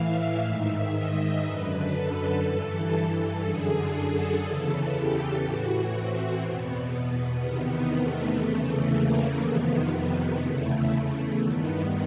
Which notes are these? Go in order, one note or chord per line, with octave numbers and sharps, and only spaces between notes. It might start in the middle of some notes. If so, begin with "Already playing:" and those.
Already playing: A2 E3 E5 F5
G#2 D#3
D#5
F#2 D3 B4
A4
G2 E3
F#2 D3 G#4
A4
E2 C#3 E3 A4
G4
A2 E3 F#4
C4
E2 B2 B3
B3
E2 C3 D#3 B3
A3
E2 C#3 E3 A3
A#3
F2 C3 D#3 B3
B3
E2 C#3 E3 A3
G2 D#3 B3